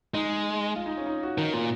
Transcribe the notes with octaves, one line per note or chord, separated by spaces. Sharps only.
G#3 D#4
F4
D#4
C#4
D#4
F#4
D#3
A#2